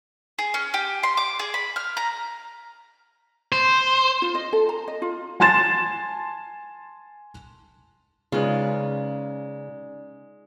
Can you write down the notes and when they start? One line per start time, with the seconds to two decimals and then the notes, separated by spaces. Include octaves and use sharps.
0.39 G#4
0.54 C#4
0.74 G4
1.03 C6
1.17 D6
1.39 G#4
1.54 B5
1.76 F6
1.97 A#5
3.52 C5
4.22 F4
4.35 D#5
4.53 A4
4.69 A#5
4.88 D#5
5.02 F4
5.40 G#5 A5 C6 A6 E7
8.32 C#3 G#3 C#4 D#4 F4 B4 D5